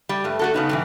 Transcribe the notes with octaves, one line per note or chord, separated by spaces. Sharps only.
G3
G2 A3
A3 F#4 A4
C#3 B3 D#4
G2 B2 E3